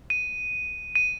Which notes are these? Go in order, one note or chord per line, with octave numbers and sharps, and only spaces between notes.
D#7
D#7